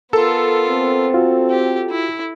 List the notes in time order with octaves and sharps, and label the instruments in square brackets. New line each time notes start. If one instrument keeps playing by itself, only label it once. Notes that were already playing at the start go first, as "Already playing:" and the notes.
[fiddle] B3 F4 [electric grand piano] A4 [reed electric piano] A#4
[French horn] C4
[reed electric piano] F4 F#4
[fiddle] G4
E4